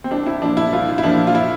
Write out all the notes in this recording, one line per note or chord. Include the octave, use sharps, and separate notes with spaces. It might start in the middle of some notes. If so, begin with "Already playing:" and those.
C4
C2 D4
E4
A#2 F3 D4
E4
C2 F4
E4
A#2 F3 D4
F4
E4